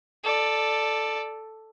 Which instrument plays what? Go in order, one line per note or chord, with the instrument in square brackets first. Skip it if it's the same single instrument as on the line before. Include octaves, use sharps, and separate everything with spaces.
[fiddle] A4 D5